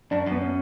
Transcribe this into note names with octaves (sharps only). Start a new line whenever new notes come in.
F#2 D4
F#2
B3
C#4